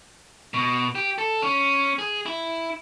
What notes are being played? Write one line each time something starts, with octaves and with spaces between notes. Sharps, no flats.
B2
G4
A4
C#4
G#4
E4